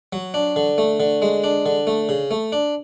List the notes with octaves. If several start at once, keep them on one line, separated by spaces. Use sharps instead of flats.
F#3
D4
D3
A3
D3
G#3
D4
D3
A3
C#3
A3
D4